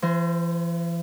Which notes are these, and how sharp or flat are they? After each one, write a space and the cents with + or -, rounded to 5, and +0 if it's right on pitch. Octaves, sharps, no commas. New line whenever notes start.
E3 +45 C5 +0